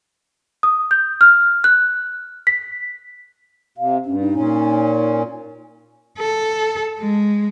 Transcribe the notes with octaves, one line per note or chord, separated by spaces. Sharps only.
D#6
G6
F6
F#6
B6
C3 F5
G2 C#4
D#4
A#2 C#4
A4
G#3